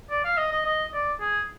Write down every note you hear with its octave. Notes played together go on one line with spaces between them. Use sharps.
D5
F5
D#5
D#5
D#5
D5
G#4